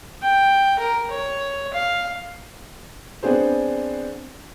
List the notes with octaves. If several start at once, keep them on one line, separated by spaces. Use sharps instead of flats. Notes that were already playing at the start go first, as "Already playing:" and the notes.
G5
A#4
C#5
F5
B3 C4 D4 G#4 C5